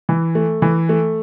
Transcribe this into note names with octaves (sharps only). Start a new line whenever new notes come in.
E3
A3
E3
A3